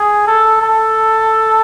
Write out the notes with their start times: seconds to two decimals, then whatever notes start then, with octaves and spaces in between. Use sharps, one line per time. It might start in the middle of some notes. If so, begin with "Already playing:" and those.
Already playing: G#4
0.27 A4
0.62 A4